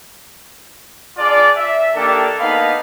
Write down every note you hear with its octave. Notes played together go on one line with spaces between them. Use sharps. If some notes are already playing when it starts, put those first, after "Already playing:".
D4 F4 G#4 D5
E5
D#3 A#3 D4 G4 A4
A#3 B3 D#4 A4 B4 F5